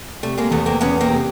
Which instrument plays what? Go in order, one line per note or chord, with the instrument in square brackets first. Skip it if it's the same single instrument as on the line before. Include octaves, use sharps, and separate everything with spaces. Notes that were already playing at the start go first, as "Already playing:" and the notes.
[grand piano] C3 [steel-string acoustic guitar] G3 A3
[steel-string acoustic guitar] G#3 A#3
[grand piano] E2 [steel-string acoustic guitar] A3 B3
[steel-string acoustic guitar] A#3 C4
[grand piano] E2 [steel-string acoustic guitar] B3 C#4
[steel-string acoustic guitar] A#3 C4
[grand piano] C3